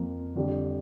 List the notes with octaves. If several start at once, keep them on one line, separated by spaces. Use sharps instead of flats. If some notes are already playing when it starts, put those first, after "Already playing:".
Already playing: F2 F3 A#3
F2 D3 G3